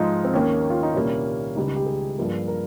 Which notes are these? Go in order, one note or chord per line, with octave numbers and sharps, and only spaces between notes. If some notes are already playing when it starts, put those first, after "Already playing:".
Already playing: G#2 F3 G#3 D#4 F4
C4
D#2 D#3 A#3 C#4
F4
D#4
C2 A#2 G3 A#3 C#4
C#2 C#3 G3 D#4
D#4
G4
G#4
G2 F3 A#3
A#4